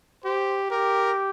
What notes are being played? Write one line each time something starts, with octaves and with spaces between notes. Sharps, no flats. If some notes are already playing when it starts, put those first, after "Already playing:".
G4 C5
G4 A#4